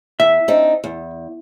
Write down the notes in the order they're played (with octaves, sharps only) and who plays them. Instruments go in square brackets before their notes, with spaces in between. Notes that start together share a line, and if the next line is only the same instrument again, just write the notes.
[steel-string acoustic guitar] E2 [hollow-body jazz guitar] E5
[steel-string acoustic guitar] C4 D4 D#4
E2